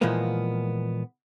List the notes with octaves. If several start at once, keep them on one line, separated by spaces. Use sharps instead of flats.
A#2 E3 F3 G#3 A#3 B3